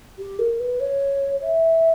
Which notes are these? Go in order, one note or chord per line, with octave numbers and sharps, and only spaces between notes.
G4
A#4
B4
C#5
E5